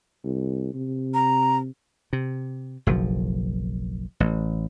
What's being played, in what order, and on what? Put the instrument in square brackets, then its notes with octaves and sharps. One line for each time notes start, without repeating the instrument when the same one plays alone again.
[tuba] C2
C3
[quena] A#5
[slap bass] C3
F#1 B1 F3
A1